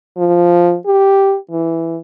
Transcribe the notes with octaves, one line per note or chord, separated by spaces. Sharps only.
F3
G4
E3